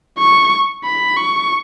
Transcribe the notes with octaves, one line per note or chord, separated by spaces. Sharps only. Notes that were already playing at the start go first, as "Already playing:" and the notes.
C#6
B5
C#6